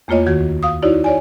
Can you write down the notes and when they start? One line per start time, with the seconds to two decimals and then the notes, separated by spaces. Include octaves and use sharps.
0.08 E2 A3 A#3 F4 C#5 D#5
0.26 D2 D#3 F#4 G#6
0.63 F5 D#6
0.82 D#4 E4 F#4 C#5 D5
1.04 C#5 D5 G#5